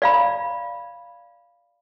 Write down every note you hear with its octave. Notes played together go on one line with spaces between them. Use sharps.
D5 F5 B5